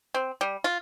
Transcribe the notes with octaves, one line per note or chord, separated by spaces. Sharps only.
C4
G3
F4